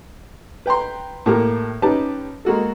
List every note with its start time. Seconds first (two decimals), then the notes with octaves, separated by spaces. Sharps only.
0.66 B4 G5 A#5 C6
1.26 A2 A3 A#3 G4
1.82 C#4 D#4 G4 B4 A5
2.45 G#3 A#3 F#4 A4